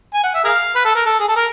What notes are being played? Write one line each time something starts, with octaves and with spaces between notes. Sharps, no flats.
G#5
F#5
E5
G#4 A#4 F5
B4
A4
A#4
A4
G#4
A4
A#4